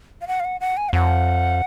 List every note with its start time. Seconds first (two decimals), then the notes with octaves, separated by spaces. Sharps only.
0.21 F5
0.28 F#5
0.40 F5
0.45 F#5
0.61 F#5
0.77 G#5
0.89 F5
0.93 F2 F#5